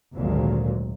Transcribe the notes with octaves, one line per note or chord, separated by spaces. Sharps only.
G#1 D2 A#2 F#3 G#3